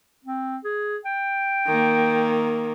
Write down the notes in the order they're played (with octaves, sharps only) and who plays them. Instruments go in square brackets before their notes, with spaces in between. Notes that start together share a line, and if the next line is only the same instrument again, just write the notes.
[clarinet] C4
G#4
G5
[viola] D#3 A#3